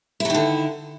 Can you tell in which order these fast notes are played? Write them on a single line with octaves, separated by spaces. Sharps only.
E4 F#3 D#3 D3